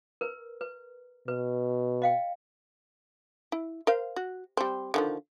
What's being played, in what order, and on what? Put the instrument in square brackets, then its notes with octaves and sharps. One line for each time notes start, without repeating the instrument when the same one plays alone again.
[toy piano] A#4 B4
B4
[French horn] B2 [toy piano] B4
[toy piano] D#5 F5 G5
[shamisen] E4
A#4 C5 F5
F#4
G3 C4
D3 D#3 F3